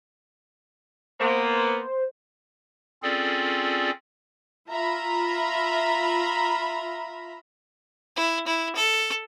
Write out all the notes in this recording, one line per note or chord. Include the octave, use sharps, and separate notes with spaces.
A#3 B3 C5
C4 C#4 F4 G#4 A4 D5
F4 E5 A#5 B5
E4
E4
A4